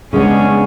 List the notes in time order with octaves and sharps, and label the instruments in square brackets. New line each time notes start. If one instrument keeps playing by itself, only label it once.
[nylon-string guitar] C#3 G#3 B3 D4 [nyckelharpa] C#4